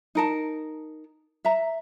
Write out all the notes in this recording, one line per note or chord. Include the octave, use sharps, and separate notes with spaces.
D#4 A#4 A5
E5 A#5